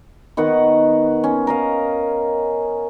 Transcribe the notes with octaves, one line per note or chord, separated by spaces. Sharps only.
D#3 B3 F#5 C#6
C#4
A#4 D#5 F5